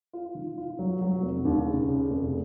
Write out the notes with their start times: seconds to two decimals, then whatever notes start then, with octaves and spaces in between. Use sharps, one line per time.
0.13 F4
0.35 D#3
0.58 F4
0.79 F#3
1.01 F#3
1.23 F1
1.45 D#2
1.66 C#3
1.89 C#3
2.10 F1